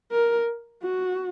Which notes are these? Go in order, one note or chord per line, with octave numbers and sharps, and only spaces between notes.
A#4
F#4